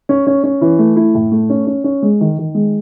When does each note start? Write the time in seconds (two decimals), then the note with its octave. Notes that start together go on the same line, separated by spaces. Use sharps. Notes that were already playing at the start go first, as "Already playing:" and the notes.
0.09 C#4
0.27 C#4
0.44 C#4
0.61 E3
0.79 A3
0.96 E4
1.14 A2
1.32 A3
1.50 C#4
1.67 C#4
1.84 C#4
2.02 G#3
2.20 D#3
2.38 D#3
2.54 G#3